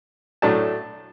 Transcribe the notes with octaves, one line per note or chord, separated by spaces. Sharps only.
A2 F#3 A3 D4 A5